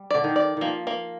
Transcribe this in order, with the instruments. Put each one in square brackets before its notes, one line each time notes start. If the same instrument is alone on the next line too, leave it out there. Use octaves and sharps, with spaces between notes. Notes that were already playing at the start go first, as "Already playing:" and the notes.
Already playing: [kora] G3
[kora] D3 [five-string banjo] D5
[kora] D#3
[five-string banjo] D5
[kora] D#3 F3 [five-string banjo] A#3
[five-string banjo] A#3